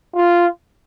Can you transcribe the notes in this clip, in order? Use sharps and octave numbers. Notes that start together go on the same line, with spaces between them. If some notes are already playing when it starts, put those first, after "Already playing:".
F4